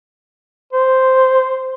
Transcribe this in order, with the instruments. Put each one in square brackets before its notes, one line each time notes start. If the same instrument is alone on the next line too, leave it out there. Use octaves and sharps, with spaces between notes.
[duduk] C5